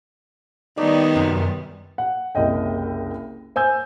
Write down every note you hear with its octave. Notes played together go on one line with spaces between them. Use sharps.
D#3 G3 A3 B3 D#4 D5
F#2 C3
F#5
F#1 C2 D#5 G5
C5 G#5 E6 G6